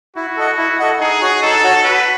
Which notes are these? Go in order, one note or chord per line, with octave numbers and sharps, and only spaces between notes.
E4 F#4
A4 D#5 F#5
E4
A4 D#5 F#5
D#4 G#4
F#4 C#5 F#5
D#4 A4
F#4 C#5 F#5
F#4 B4